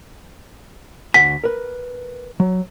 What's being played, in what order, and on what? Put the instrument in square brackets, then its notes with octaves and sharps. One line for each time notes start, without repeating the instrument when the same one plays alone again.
[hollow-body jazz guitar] D2 F#5 G#5 [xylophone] B6
[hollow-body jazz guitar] A#4 B4
F#3